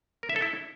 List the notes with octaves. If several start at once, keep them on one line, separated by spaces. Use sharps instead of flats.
A#4
E5
A4
E4